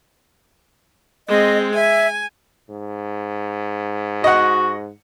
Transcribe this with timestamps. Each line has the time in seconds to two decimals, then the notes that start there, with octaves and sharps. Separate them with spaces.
1.28 G#3 C4 D#5
1.75 E5 G#5
2.69 G#2
4.24 F#4 D#5 F#5